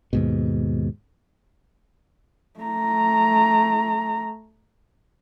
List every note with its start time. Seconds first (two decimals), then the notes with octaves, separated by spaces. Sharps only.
0.13 D#2 G#2 B2
2.60 A3 A#5